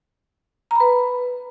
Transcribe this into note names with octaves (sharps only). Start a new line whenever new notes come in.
B4 A#5 B5